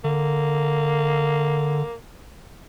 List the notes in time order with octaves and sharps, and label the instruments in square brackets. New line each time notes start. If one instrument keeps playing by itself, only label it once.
[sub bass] D3 [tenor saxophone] A#3